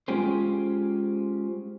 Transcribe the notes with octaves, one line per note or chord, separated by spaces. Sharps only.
G#3 C#4 F4 G4 G#4 C5